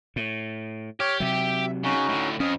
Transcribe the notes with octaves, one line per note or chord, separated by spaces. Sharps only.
A2
G4 C#5 F6
C3 F#3 E5
C#3 C#4 D#4 F#4
A2 D3
F2 C#4 D#6 F6